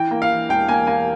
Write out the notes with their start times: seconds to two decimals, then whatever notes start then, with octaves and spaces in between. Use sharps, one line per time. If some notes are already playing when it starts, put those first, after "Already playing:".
Already playing: E3 G5
0.11 A#3
0.22 F5
0.30 E3
0.49 E1 G5
0.68 A#3 G#5
0.87 A#3 G#5